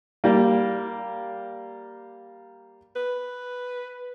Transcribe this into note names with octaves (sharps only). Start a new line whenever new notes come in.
G3 A#3
B4